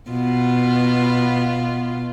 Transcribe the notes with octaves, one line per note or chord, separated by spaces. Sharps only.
B2 B3 F4